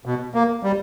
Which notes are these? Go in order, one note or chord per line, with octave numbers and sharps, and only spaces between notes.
B2
A#3
G3